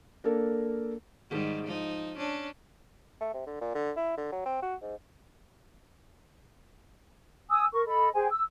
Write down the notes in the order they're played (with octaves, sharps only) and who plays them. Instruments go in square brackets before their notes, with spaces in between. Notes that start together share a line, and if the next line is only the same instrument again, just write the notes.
[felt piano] A#3 D4 A4 A#4
[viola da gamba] G#2 D#3 G3
F3 D#4
C#4 D4
[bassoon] A3
C3
D3
A#2
D3
E4
D3
F#3
C4
F#4
G#2
[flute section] G#5 D#6 E6
A#4 C#6
A4 D#5 B5
G#4 C5 G5 G#5
E6